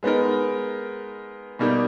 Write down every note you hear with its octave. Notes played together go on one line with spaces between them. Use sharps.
G#3 B3 D#4 A#4
B2 G3 A#3 D#4 G4